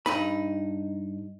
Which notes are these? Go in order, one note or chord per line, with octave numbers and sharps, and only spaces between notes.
G2 D#4 B5